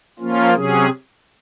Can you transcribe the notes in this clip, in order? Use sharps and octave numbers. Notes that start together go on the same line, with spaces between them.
F3 A#3 C#4 F4
C3 F#3 C#4 G#4